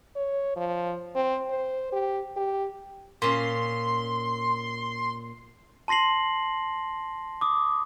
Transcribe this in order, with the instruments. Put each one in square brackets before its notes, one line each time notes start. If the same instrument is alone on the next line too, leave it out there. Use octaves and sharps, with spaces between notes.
[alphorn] C#5
F3
C4
C5
G4
G4
[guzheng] A#2 C#4 [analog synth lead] C6
[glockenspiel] A5 C6 A#6 C7 F#7
D6 D#6